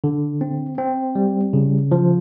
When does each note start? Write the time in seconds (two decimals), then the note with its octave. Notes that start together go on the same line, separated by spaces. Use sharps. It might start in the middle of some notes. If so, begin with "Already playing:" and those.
0.04 D3
0.41 C4
0.78 C4
1.15 G3
1.53 C#3
1.92 F3